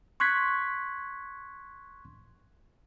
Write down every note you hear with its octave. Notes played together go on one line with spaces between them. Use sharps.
C6 C#6 F#6 G#6 B6